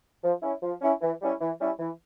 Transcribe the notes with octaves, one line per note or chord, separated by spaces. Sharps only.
F3
C#4 E4
F3
C#4 E4
E3
G3 C#4 E4
E3
G3 C#4 E4
E3